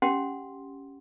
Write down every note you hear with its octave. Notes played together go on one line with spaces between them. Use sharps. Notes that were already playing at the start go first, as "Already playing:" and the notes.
C#4 G4 F#5 C6